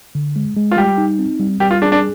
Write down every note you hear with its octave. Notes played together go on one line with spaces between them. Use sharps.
D3
G#3
G#3
F4
G3 G4
D#4
C4
G3
G3 G4
F4
D4 G#4
D4